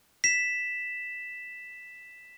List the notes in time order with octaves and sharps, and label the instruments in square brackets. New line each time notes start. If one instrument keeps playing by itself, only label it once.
[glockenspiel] B6 E7